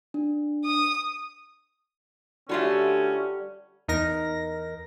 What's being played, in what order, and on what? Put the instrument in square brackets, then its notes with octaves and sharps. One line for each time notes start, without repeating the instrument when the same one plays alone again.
[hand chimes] D4
[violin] D#6
[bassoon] D3 [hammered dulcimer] G3 [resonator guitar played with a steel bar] A3 F4 F#4 [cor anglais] C#4
[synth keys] E2 D#4 A#4 A#6